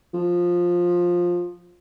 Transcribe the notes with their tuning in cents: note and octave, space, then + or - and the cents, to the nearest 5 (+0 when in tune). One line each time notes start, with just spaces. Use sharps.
F3 +10